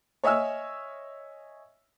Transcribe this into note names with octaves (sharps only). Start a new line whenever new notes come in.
C#5 D#5 E5 G#5 E6 F6